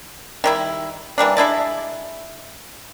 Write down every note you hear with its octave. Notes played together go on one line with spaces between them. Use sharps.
D#3 G3 E4
E3 G3 A#3 D4
G#3 D4 E4 A5